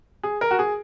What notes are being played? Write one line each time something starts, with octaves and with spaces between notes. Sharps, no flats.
G#4
A#4
F#4
G#4